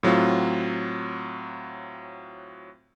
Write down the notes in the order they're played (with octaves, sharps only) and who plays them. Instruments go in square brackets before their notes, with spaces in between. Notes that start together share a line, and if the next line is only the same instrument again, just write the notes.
[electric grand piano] A2 F#3 C4 F4